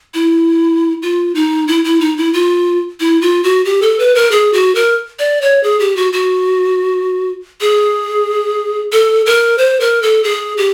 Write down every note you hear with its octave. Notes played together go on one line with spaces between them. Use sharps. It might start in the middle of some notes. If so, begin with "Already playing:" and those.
E4
F4
D#4
E4
E4
D#4
E4
F4
E4
F4
F#4
G4
A4
B4
A#4
G#4
F#4
A#4
D5
C#5
G#4
G4
F#4
F#4
G#4
A4
A#4
C5
A#4
A4
G#4
G4